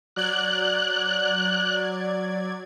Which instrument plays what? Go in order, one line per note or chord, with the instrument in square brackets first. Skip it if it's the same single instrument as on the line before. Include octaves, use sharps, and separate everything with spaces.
[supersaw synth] F#3 D5 G#6 [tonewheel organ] F#6